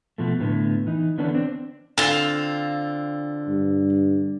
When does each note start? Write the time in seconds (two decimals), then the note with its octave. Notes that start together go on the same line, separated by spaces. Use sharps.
0.18 B2 F3 A3
0.40 A2 D3 B3
0.87 E3 D#4
1.18 D3 E3 B3 C#4 D4
1.35 C4 D4
1.98 D3 C4 F4
3.48 G2